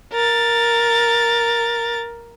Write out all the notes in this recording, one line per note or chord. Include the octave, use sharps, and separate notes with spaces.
A#4 A6